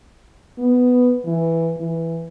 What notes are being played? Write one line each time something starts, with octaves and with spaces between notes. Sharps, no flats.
B3
E3
E3